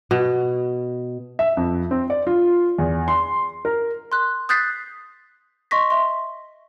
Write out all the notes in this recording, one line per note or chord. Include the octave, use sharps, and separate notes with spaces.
B2
E5
F2
C4
D5
F4
E2
C6
A#4
C6 F#6
D#6 F#6 G6 A6 B6 C7
D#5 C6 C#6 A#6 B6
E5 C6